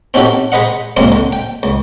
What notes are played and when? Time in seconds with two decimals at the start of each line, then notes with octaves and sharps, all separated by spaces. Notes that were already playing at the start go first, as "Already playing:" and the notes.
0.14 C4 C#4 D#4 F#4 G4 A4
0.52 G#4 B4 C5 D#5 F#5
0.97 C#2 F#2 G#3 A#3 C4
1.12 D3
1.32 G5
1.63 C#2